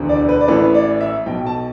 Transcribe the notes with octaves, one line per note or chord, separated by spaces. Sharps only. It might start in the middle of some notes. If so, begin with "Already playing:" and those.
Already playing: E1 D2 D3
D5
B4
D5
A1 A2 E3 B4
D5
E5
B1 B2 G5
A5